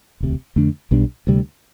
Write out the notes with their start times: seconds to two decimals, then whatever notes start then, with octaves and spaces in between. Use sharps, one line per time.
0.20 E1 D2 C3
0.56 F2 D3 A3 D4
0.91 B1 B2 G3 D4
1.27 D2 C3 G3